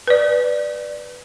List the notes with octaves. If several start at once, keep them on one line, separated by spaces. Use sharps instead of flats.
B4 D5